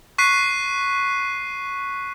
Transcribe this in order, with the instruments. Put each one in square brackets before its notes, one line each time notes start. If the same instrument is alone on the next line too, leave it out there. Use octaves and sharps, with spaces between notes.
[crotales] C#6 F#6 B6 C7 D#7